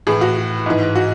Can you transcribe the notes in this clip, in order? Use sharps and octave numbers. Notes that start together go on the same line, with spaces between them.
A2 E3 G#4
F#4
G#2 E3
F#4